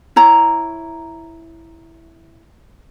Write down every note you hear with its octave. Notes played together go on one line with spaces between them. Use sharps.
E4 C#5 A#5